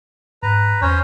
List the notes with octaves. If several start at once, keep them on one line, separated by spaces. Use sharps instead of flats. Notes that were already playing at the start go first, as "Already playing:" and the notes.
G#2 B4 A#5
E2 C#4 C5 C#5